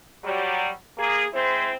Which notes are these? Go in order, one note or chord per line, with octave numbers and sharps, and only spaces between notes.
F#3 G3
A#3 G#4
G#3 C4 E4 C5